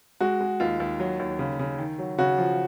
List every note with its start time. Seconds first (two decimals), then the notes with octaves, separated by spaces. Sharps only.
0.20 G#3 F#4
0.40 G#3
0.60 D#2 F4
0.80 D#2
1.00 F#3
1.19 D#2
1.39 C#3
1.59 C#3
1.78 D#3
1.99 F#3
2.18 C#3 F#4
2.38 F3